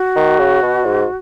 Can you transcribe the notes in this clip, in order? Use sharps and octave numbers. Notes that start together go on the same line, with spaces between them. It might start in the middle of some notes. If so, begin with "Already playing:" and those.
Already playing: F#4
D#3
C#3
B2
G#2